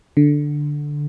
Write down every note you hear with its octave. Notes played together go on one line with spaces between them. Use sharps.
D3